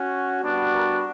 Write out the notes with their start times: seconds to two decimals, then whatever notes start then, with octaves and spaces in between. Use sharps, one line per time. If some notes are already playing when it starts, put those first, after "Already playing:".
Already playing: C#4 F#4
0.41 G3 B3 D4 F#4
0.73 A#4